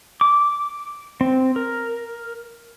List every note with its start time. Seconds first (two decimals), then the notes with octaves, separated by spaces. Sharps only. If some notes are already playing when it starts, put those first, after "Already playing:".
0.21 D6
1.21 C4
1.56 A#4